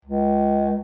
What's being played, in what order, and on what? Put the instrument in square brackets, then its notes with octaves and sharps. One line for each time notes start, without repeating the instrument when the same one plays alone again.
[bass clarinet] C#2